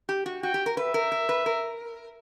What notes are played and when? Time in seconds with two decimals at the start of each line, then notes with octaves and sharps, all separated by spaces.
0.09 G4
0.26 F#4
0.43 F#4 G5
0.54 G4
0.66 A#4
0.77 B4 E5
0.94 A#4
1.12 A#4
1.29 B4
1.46 A#4